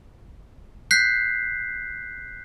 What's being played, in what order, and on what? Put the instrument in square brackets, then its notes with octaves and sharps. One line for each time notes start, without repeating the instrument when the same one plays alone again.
[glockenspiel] F#6 G6 B6 C7